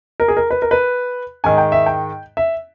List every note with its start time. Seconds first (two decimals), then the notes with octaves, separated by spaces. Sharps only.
0.20 A#4
0.28 G#4
0.37 A#4
0.51 B4
0.62 A#4
0.71 B4
1.44 G#2 D#3 G#5
1.58 G5
1.72 E5
1.86 G5
2.37 E5